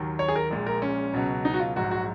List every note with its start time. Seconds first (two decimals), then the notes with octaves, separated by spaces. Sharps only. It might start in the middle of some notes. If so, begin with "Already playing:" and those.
Already playing: D#2 D#3 F#3
0.19 C#5
0.28 G#4
0.36 A#4
0.51 A#1 A#2 G#3
0.67 A#4
0.82 C#4
1.13 C#2 B2 F#3
1.45 D#4
1.54 F#4
1.60 F4
1.76 A#1 G#2 F#3 F#4
1.91 F#4